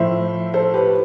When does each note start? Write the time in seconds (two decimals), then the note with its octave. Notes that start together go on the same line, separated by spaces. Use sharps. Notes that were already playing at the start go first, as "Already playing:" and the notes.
Already playing: A2 F3 C5 E5
0.54 A4 C5
0.74 G4 B4